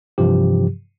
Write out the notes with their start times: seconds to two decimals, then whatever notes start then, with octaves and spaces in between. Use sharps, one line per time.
0.18 G2 C3 E3 F3 G4